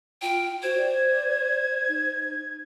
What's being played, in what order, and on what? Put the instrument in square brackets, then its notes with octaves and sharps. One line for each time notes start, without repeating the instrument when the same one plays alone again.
[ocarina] F4 [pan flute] G5
[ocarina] F#4 [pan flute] C5 [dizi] G#6
[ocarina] D5
D#4